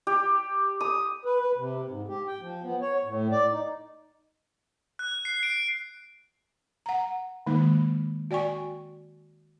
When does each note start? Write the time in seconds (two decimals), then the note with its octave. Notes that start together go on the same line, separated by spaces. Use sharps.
0.07 G4
0.81 D#6
1.25 B4
1.40 B4
1.58 C3
1.88 G#2
2.09 G4
2.28 G5
2.41 F3
2.63 B3
2.81 C#5
3.05 A2
3.32 D5
3.52 D#4
4.99 F#6
5.25 C7
5.43 D7
6.86 F#5 A#5
7.46 D#3 G#3 A#3 D#4
8.31 F#4 D5 G5 G#5 C#6